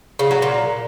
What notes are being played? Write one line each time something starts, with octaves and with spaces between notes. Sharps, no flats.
C#3
F#3
A#2